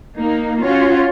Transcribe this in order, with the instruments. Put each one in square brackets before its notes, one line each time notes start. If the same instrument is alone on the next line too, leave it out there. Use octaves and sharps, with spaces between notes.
[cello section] A#3 D#4
C#4 F4 F#4 C#5